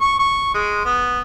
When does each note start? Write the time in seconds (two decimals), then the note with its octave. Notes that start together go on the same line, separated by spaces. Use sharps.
0.01 C#6
0.19 C#6
0.54 G#3
0.85 B3